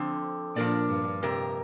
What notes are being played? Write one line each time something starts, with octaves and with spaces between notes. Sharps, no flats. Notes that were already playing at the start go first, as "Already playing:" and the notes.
Already playing: D3 F3 C4
A#2 F3 D4 A#4 D5
G2
F2 C3 A#3 G4 A#4